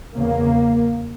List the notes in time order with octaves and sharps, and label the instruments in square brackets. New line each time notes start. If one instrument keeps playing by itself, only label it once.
[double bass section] E2 C#3 A#3